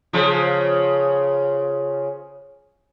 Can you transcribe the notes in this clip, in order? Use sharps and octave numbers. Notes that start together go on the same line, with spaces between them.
C#3 F3